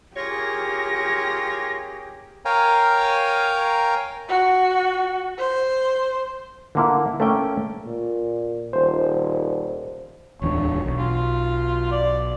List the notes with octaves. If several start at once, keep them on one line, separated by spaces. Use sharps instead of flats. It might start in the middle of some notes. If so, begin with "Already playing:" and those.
A#3 C#4 F4 G4 G#4 C#5 A#6
A#4 C#5 F5 G5 G#5 A#5
F#4
C5
D3 A#3 E4
A3 A#3 C#4 G5
A#2
D#1 C5
D1 E2 D4 C#5
B1
F4
D5